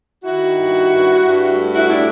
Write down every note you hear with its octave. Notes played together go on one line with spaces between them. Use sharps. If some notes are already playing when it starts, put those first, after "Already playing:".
D#3 E4 F#4
G2
G2
G2
A3
E4 F#4
A2 D4 E4